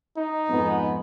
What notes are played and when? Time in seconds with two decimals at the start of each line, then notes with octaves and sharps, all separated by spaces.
0.17 D#4
0.49 F2 G#2 B3